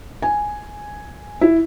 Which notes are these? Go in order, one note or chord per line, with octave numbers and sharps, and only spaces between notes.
G#5
E4